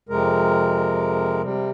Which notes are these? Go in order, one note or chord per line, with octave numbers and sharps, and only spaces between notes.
F2 C3 G#3 A#4
C3 G3